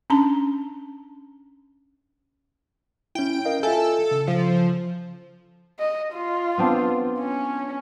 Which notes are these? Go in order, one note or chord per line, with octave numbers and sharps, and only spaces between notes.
C#4 D4 A5 A#5
C#4 E4 G5
A#4 D#5 F5
F4 A4 E5 G#5
C#3
F3
D#5
F4
B3 C4 D4
C#4